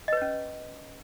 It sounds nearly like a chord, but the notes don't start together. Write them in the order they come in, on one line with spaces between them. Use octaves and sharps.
D#5 B4 C#5 C#4